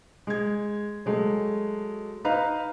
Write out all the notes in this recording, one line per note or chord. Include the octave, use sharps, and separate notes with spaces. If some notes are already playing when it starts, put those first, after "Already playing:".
G#3 G#6
F#3 G#3 A3
D#4 B4 D#5 F5 A#5